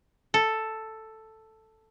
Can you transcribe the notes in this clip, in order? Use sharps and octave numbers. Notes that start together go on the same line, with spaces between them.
A4